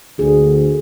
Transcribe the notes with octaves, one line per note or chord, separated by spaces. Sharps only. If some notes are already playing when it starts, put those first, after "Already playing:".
D2 G#4